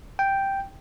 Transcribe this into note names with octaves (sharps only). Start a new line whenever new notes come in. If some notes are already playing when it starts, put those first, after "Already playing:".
G5